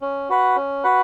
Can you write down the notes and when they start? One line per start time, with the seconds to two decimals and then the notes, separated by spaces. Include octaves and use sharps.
0.01 C#4
0.29 F#4 B4 F#5
0.56 C#4
0.84 F#4 B4 F#5